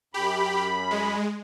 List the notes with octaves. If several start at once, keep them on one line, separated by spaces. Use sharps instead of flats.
F#2 G4 B5
G#3